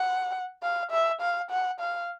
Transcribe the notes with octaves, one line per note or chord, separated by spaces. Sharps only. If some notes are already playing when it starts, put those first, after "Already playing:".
Already playing: F#5
F5
E5
F5
F#5
F5